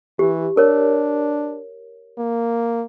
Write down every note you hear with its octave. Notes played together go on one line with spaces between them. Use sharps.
E3 G4
D4 A#4 C#5
A#3